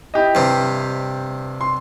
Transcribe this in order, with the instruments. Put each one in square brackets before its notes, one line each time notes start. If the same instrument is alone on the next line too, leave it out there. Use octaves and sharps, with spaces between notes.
[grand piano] E4 G4 D#5
[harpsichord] G2 C3
[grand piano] C6